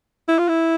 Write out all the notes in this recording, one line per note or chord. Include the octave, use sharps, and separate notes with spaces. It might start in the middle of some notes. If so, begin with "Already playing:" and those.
E4
F4
E4